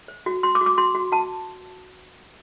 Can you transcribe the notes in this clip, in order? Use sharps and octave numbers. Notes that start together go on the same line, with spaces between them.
C5
F#4
F#4 C6
D6
F#4
D6
F#4 C6
F#4
F#4 A5